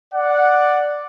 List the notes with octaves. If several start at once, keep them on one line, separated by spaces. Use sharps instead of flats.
D5 F#5